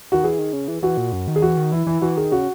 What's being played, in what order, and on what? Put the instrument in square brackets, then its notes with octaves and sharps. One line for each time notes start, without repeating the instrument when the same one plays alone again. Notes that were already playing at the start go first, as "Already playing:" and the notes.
[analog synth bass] D#3 [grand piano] F#4
[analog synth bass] E3 [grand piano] G#4
[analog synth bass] D#3
C#3
E3
[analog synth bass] E3 [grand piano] F#4
[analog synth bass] A#2
F#2
D#3
[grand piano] G#4
[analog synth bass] E3 [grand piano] F#4
[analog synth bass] D#3
[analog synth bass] E3 [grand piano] E4
[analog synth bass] E3 [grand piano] E4
[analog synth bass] E3 [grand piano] F#4
[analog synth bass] D#3 [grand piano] G#4
[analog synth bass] C#3 [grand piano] F#4